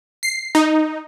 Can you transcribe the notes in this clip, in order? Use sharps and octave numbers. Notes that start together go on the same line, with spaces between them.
C7
D#4